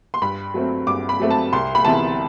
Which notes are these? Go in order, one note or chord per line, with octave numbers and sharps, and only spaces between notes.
C6
G2 B5
F#3 A3 C4
G2 D6
B5
F#3 A3 C4
A5
C2 C6
B5
C3 E3 B3 A5